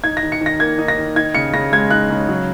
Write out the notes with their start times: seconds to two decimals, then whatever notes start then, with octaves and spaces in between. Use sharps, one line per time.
0.04 D#4 G#6
0.17 A#6
0.23 D#3
0.32 C#7
0.41 D#3
0.46 A#6
0.59 A#3 G#6
0.79 D#4
0.88 A#6
0.98 D#3
1.16 D#4 G#6
1.35 C#3 C#7
1.53 C#3 A#6
1.72 G#3 G#6
1.90 D#4 F#6
2.10 C#3
2.28 F#3